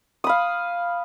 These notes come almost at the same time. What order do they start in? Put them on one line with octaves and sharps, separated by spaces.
D#6 B5 F5